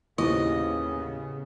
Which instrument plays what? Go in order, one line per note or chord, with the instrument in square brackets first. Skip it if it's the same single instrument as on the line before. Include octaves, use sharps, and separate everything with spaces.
[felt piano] D#2 [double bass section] A2 C#3 B3 [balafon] E4 F4 C5 [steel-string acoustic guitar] D#5